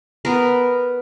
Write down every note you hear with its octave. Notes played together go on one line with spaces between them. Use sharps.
B3 A#4